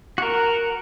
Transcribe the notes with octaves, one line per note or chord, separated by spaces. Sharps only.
F#4 A#4